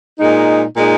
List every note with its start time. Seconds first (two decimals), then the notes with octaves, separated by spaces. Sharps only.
0.19 A#2 G#3 D#4
0.76 A#2 G#3 D#4